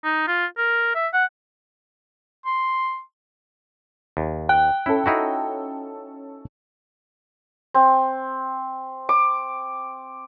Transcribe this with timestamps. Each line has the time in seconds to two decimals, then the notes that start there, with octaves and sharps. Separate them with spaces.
0.04 D#4
0.28 F4
0.58 A#4
0.95 E5
1.13 F#5
2.46 C6
4.17 D#2
4.49 G5 F#6
4.86 C#4 E4 A4
5.06 D#4 E4 F#4
7.74 C4
9.09 D6